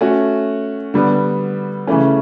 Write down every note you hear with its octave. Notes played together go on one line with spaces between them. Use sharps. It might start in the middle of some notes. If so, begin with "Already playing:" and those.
A3 C#4 F#4
D3 G3 B3
C#3 E3 A3 C#4